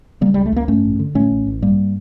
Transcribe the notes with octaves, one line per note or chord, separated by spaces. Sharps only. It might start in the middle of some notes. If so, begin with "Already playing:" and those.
C#3 G3 A#3
C#2 G3
A3
C#2 A#3
G2 A3 C#4
A1
D3
A2 A3 C#4
A1
A1
G2 G3 A#3